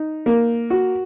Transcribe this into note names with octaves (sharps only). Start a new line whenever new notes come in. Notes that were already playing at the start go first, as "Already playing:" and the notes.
Already playing: D#4
A#3
F#4